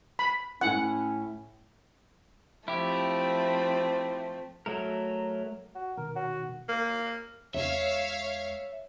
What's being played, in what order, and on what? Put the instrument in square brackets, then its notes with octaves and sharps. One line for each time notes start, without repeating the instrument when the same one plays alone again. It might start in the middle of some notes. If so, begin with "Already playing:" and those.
[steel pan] B5
[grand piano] A2 E4 [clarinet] C#4 [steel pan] F#5
[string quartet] F3 A3 C4 [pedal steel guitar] E4 G4
[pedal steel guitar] F#3 A3 A#4
[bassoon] F#4
[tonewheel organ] B2 D#3 [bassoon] A#4
[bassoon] F#4
[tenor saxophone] A#3
[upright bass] E2 G#3 [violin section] C#5 F5 [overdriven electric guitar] E5